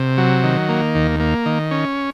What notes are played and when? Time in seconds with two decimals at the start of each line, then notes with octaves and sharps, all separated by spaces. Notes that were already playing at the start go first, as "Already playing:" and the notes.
Already playing: C3
0.18 F#3
0.44 D#3
0.69 A#3
0.95 D#2
1.20 A#3
1.46 D#3
1.71 C#4